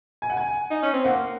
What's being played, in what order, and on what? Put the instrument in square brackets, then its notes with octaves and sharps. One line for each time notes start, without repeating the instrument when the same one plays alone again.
[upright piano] G#5
F#5
G#5
[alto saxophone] D#4
C#4
C4
[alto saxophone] A#3 [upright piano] F#5